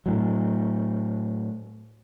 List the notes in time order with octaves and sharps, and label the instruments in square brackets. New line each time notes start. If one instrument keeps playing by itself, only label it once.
[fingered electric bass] A2 F#3